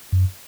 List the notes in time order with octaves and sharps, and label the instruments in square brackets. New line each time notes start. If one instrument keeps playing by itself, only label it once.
[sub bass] F#2